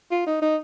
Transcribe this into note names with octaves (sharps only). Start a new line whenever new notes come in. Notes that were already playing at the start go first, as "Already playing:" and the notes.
F4
D#4
D#4